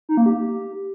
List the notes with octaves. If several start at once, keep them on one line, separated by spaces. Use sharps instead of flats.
D#4
A#3
G4